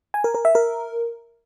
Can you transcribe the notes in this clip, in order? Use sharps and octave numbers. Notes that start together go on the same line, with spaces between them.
G#5
A#4
A#4
E5
A#4